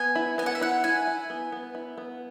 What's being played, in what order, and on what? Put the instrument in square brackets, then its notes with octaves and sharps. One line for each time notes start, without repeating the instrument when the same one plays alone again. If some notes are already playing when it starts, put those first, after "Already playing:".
Already playing: [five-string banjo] B3 [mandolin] G#5
[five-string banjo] E4
[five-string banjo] B3 [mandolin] G#5
[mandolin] F#5
E5
[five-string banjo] E4 [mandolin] F#5
[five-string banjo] E4 [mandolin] G#5
[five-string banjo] E4
B3
B3
E4
B3